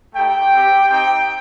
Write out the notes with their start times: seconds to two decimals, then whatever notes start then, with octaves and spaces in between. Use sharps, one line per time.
0.14 A3 D#4 G4 G5
0.51 C4 G4
0.89 C4 D#4 G4 G5